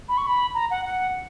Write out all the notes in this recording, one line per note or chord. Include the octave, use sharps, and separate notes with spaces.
B5
C#6
B5
A#5
F#5
F#5